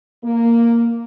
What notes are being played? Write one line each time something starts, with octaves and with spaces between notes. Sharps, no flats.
A#3